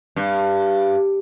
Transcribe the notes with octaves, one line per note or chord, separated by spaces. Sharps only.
G2